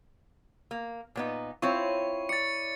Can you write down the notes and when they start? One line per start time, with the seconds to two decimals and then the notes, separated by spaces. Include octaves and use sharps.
0.71 A#3
1.15 A#2 B3 D#4
1.62 C4 E4 F4 C#5 C#6
2.29 D5 A6 C#7